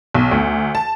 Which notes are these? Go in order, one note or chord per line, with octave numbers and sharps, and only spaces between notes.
B1
D2
A5